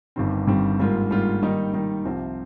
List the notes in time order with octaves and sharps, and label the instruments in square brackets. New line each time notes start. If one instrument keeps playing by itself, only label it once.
[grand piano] G1 G2 D#3 G3 C4
G1 G2 D#3 G3 C4
G#2 G3 A#3 F4
G#2 G3 A#3 F4
D#3 G3 A#3 D#4
D#3 G3 A#3 D#4
C2 C3 F3 C4 F4